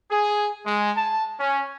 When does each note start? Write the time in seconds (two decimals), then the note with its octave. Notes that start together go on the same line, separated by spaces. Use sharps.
0.11 G#4
0.66 G#3
0.97 A5
1.40 C#4